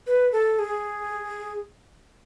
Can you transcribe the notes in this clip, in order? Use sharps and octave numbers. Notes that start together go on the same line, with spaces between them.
B4
A4
G#4